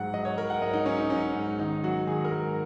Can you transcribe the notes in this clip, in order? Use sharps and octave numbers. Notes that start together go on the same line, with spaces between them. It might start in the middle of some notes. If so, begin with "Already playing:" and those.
Already playing: G#2 F#3 F#5
F#3 D#5
C#5
F#3 A#4
F#5
G#2 D#5
D#4
F#3 C#4
D#4
F#3 C#4
G#2
D#3 D#4
F#3 F#4
D#3 G#4
A#4
G#2